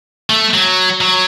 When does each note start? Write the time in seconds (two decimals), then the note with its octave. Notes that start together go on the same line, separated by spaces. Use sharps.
0.30 A3
0.54 F#3
1.01 F#3